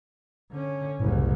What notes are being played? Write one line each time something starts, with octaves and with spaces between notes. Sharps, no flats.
D3 C#4
F#1 C2 A2